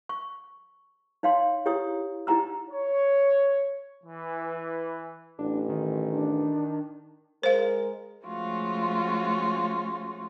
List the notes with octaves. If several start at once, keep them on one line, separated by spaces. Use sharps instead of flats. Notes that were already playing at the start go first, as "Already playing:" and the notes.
C#6
D#4 C#5 F5 G5 C6
E4 G4 C#5 G5 D#6
D#4 E4 G4 G5 A#5 E6
C#5
E3
A1 D4
D#3
D4
G#3 A#4 C5 F5
F3 G#3 A3 C#4 F4 F#4